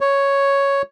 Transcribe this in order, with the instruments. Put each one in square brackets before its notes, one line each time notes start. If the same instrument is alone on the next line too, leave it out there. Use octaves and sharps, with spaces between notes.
[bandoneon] C#5